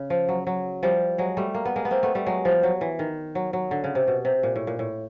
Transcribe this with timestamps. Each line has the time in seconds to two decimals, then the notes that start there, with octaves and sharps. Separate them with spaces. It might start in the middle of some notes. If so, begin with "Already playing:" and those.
Already playing: C#3
0.10 F3
0.29 F#3
0.47 F#3
0.83 F3 G3
1.18 F#3 G#3
1.37 G3 A3
1.54 A#3
1.65 B3
1.76 G#3 A#3
1.85 B3
1.91 A#3 C4
2.03 A3 B3
2.15 G3 A3
2.26 F#3 G#3
2.45 F3 G3
2.63 F#3
2.81 E3
2.99 D#3
3.35 F#3
3.53 F#3
3.71 D3
3.84 C#3
3.95 C3
4.08 B2
4.25 C3
4.43 A#2
4.56 A2
4.67 A#2
4.79 A2